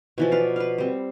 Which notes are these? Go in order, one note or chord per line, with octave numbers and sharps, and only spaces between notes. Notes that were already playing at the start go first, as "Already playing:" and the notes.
B2 E3 F3
B4 D5 F5
B4 F5
G3 C4